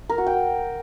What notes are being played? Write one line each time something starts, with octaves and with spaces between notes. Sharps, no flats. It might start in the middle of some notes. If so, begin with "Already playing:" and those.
A#4
F#4
G5